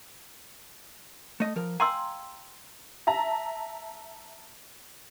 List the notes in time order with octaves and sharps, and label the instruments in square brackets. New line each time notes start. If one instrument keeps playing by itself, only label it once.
[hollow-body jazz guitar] A3 D#5
F3 A#4
[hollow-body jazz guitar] F5 G5 G#5 [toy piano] A#5 C6 E6
[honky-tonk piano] E5 A5 A#5